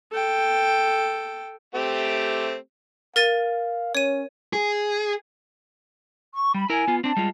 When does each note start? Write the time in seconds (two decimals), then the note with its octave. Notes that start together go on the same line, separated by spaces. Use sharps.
0.12 A4 G5
1.75 A3 C4 G4
3.16 A#4 F5 A6 D#7
3.95 C#4 C#5 D#7
4.53 G#4
6.35 C#6
6.54 G3 B5
6.70 E4 A#4 G#5
6.88 B3 F4
7.04 C4 D4 A5
7.17 G3 G#3 F4